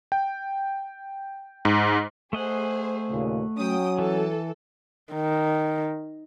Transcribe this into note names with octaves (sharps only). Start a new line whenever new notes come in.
G5
G#2
A3 G#4 C5 D#5 F#5
D#2 A#2 C#3
F#3 C#4 G5 D#6
E3 A4
D#3